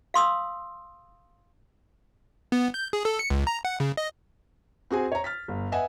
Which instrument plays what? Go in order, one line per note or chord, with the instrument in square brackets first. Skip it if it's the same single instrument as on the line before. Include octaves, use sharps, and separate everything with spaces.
[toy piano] F5 C6 D#6 E6
[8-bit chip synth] B3
G6
G#4
A4
C#7
C#2
A#5
F#5
C#3
D#5
[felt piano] C4 F#4 G#4 G#5
C#5 A#5
F6 A6 B6
G1
B4 D#5 E5 F#5 G#5